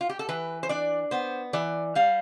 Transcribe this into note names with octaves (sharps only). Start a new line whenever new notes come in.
F4
G4
A4
E3 B4
C5
D4 D5
B3 C5
E3 D5
G3 F5